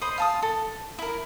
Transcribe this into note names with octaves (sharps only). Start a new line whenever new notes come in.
C5 D#5 B5
F5 A5 D#6
A4
E4 A#4